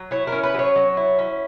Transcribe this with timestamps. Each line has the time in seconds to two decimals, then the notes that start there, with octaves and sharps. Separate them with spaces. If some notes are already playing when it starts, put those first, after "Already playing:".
Already playing: F#3
0.11 E4 C#5
0.27 C#4 A#4
0.43 B4
0.54 F#3 C#5
0.76 F#3
0.97 E4
1.19 C#4